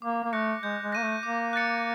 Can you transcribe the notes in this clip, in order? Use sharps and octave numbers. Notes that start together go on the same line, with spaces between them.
A#3 D6
A#3
A3 F#6 A#6 C#7
G#3 G6
G#3
A#3 A#6 D#7
A3
A#3 D6
F#6 A6 C#7